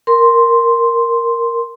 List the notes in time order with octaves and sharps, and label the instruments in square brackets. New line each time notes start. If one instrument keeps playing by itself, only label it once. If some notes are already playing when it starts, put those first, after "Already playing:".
[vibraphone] A#4 C6